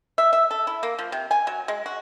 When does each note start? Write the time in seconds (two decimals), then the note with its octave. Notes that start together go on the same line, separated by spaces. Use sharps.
0.18 E5
0.33 E5
0.51 A4
0.67 E4
0.83 A#3
0.99 F3
1.12 C3
1.31 G#5
1.47 F#3
1.68 G#3
1.86 F#4